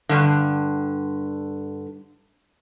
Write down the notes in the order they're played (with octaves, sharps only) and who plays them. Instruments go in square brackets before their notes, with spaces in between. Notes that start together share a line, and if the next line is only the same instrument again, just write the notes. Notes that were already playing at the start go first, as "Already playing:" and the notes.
[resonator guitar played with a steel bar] G2 D3